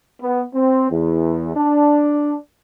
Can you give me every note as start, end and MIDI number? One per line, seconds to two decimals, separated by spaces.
0.20 0.42 59
0.54 0.89 60
0.90 1.53 40
1.56 2.34 62